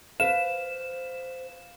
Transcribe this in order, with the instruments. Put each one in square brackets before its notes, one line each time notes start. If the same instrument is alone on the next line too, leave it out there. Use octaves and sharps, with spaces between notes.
[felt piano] B4 F5 [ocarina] C5 [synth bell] E7